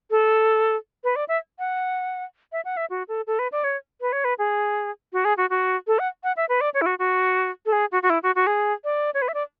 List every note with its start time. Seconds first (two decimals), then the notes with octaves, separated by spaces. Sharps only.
0.11 A4
1.04 B4
1.16 D5
1.28 E5
1.59 F#5
2.52 E5
2.65 F#5
2.77 E5
2.90 F#4
3.08 A4
3.27 A4
3.39 B4
3.52 D5
3.64 C#5
4.01 B4
4.12 C#5
4.25 B4
4.39 G#4
5.13 F#4
5.25 G#4
5.37 F#4
5.50 F#4
5.87 A4
5.99 F#5
6.24 F#5
6.37 E5
6.49 B4
6.61 D5
6.74 C#5
6.82 E4
6.86 F#4
6.99 F#4
7.66 A4
7.72 G#4
7.92 F#4
8.03 F#4
8.10 E4
8.23 F#4
8.35 F#4
8.47 G#4
8.84 D5
9.14 C#5
9.22 B4
9.28 E5
9.34 D5